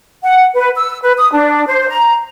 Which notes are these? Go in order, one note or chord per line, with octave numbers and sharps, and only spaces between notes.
F#5
B4
E6
B4
D#6
D4
C5
A#5